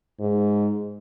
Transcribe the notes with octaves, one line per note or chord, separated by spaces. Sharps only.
G#2